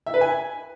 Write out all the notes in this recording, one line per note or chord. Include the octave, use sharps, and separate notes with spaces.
E5
B4
G#5